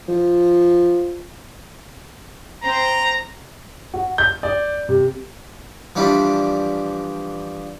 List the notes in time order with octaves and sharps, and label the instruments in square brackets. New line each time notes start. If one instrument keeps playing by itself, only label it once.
[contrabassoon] F3
[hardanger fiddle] C4 C5 [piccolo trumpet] A#5
[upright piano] F#4
G6
D5
C3
[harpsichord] E3 F3 G3 D4